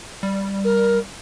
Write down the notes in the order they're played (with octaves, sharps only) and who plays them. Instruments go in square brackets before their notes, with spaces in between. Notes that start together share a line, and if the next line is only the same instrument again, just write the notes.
[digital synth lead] G3
[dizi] A#4